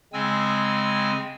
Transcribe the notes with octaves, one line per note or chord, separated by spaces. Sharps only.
C#3 G#3 C4 G#5 E6